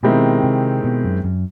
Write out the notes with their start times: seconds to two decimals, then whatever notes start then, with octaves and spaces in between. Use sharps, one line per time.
0.03 B2 D#3 G#3 C4 E4 G4
0.43 C3
0.84 B2
1.04 F#2
1.24 F#2